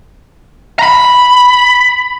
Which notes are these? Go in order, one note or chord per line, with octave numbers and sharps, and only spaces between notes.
A#5 B5